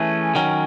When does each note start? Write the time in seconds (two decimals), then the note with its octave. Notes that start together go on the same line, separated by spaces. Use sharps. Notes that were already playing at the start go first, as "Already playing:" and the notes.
Already playing: E3 A3 C#4 G#4
0.35 D#3 F#3 C#4